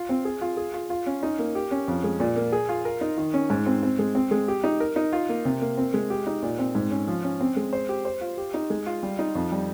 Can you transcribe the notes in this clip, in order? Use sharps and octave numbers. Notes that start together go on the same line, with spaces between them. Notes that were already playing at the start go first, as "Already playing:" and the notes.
Already playing: F4
C4
G#4
F4
G#4
F4
F4
C#4
D#4
A#3
G4
C#4
F2
G#3
A#2
A#3
G#4
F4
A#4
D#4
D#3
C#4
G#2
C4
C4
G#3
C4
G#3
G4
D#4
A#4
D#4
F4
A#3
C3
A#3
C4
G#3
G4
D#4
A#2
C4
G#2
C#4
F3
C#4
C4
G#3
C5
G4
C5
F4
G4
D#4
G#3
F4
G3
D#4
F2
G3